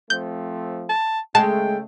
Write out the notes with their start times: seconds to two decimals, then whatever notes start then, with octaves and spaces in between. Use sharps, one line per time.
0.10 F3 A3 C4 G6
0.89 A5
1.35 C#3 G#3 A3 G5 A5